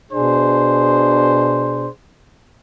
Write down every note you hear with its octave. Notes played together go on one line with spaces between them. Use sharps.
B2 D4 G#4 C5